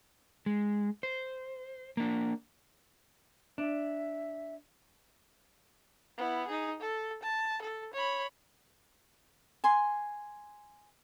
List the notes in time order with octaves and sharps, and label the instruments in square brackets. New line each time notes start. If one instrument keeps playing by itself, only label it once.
[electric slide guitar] G#3
C5
A#3 D4
[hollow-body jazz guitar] D4 [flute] E5
[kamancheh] B3 E4
D#4 G#4
A4
A5
A4
C#5 B5
[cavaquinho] G#5 C6